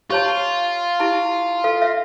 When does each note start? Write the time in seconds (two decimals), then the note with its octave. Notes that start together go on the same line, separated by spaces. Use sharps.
0.10 F4 G4 C#5 A5
1.00 E4 G4 A5
1.64 A4 F5
1.82 E5 F5